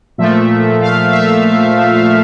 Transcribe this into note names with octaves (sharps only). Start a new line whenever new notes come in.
A#2 F3 A3 E5
F5
E5